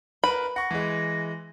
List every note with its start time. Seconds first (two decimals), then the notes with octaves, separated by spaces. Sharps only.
0.24 A#4 B4 B5
0.56 F#5 C#6 A#6
0.71 E3 G#3